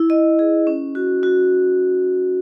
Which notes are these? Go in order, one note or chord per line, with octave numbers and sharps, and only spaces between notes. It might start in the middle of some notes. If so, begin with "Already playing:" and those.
Already playing: E4
D#5
G#4
C#4
F#4
F#4